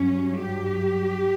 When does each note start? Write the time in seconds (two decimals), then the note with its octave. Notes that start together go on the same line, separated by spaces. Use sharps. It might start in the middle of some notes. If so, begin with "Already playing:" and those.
Already playing: G2 F#3 C#4
0.40 G4